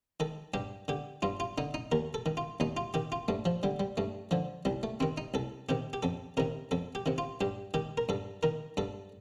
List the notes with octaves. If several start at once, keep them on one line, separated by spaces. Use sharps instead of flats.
D#3 A4
G2 G4
D3 G4
G2 F4
F4
D3 D#4
D#4
D#2 A#4
A4
D#3
F4
D#2 D#4
F4
D#3 G4
F4
G2 A3
F3
D3 G3
G3
G2 A3
D3 F3
C2 G3
A3
C3 D#3 C4
D#4
C2 A4
C3 D#3 G4
G4
F2 A4
C3 D#3 A#4
F2 A4
G4
C3 D#3
F4
G2 G4
D#3 G4
A#4
G2 A4
D#3 A#4
G2 A4